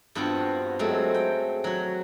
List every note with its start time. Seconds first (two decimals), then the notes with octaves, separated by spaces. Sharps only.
0.15 G2 B3 C4 F4 F#4
0.79 F#3 G#3 A3 C4
1.14 G5
1.64 F#3 F#4